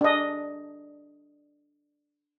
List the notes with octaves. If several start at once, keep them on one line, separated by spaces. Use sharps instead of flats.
D4 D#5